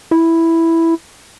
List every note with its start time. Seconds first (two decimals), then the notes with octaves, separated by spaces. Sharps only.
0.11 E4